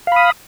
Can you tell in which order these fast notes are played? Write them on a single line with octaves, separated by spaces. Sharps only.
F5 B5 D#6